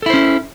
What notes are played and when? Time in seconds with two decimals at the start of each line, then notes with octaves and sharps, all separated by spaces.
0.02 A4
0.06 E4
0.10 C5
0.14 C#4